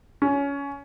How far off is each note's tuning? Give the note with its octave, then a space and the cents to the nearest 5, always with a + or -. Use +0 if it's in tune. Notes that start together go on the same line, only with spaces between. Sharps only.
C#4 +20